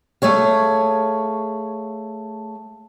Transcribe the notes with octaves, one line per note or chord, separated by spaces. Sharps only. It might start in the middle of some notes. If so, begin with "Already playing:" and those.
A3 G#4 C#5 F5